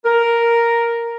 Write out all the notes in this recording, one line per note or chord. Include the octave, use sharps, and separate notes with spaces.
A#4